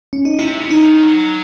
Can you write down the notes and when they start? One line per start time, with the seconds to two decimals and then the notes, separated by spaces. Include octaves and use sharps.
0.13 C#4
0.25 D#4
0.39 C3 E4
0.60 C#3
0.71 D#4
0.81 D#3
1.03 F#3